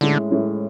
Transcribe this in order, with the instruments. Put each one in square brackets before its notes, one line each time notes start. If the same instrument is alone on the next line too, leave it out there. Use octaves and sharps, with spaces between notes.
[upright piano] A2 G#3 C#4 E4 [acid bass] D3
[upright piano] A2 G#3 C#4 E4